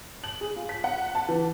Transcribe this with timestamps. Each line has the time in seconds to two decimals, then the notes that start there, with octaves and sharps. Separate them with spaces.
0.24 F#7
0.41 G#4
0.56 F4
0.69 B6
0.84 F#5
1.15 A5
1.29 E3